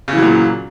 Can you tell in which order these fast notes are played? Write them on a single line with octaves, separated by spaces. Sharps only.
C#3 E3 F#3 A#2